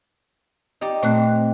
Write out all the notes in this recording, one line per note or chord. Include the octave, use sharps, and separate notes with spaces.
D#4 G4 D5
A#2 A3 C4 F#6